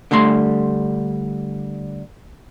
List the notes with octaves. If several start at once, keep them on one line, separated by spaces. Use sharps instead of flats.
D3 G3 A3 C6